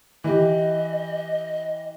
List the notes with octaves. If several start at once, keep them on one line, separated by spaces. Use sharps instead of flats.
E3 G4 D#5